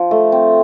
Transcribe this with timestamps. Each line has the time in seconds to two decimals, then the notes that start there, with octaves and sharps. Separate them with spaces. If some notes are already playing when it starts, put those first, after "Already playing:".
Already playing: F3
0.11 A3
0.32 C4